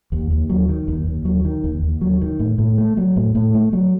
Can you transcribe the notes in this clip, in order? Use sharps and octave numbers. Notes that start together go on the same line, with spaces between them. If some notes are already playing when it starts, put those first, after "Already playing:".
D#2
D#2
F#3
D#3
D#2
D#2
F#3
D#3
D#2
D#2
F#3
D#3
A2
A2
A3
F#3
A2
A2
A3
F#3